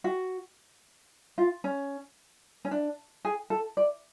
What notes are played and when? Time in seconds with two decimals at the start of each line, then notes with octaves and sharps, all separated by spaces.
0.04 F#4
1.38 F4
1.64 C#4
2.65 C#4
2.71 D4
3.25 G#4
3.50 A4
3.77 D5